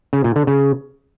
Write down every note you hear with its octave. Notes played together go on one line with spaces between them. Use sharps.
C#3
A#2
D3
C#3